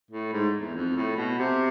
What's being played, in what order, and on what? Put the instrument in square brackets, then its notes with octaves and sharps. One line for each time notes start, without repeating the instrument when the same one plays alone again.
[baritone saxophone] A2
G#2
E2
F2
A2
B2
C3